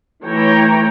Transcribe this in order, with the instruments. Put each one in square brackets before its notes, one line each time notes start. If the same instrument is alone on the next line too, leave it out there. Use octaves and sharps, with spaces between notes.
[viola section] E3 A3 C#5 G5 A#5